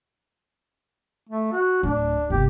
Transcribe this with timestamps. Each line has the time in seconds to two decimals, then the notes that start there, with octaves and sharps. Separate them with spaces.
1.29 A3
1.52 F#4
1.83 D1 D4
2.30 G1 C3 G4